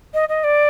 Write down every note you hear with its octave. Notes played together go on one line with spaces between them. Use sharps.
D#5
D#5
D5